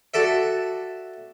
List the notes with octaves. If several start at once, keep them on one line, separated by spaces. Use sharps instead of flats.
F#4 A4 D5 E5